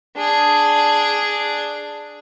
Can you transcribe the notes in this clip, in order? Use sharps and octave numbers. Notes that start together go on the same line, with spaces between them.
D4 G#4